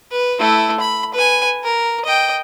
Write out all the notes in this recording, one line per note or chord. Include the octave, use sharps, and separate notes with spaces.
B4
A3 E4
B5
B4 G#5
A#4
D#5 G5